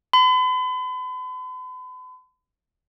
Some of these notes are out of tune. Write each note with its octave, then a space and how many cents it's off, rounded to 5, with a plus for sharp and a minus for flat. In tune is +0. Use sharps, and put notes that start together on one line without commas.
B5 +45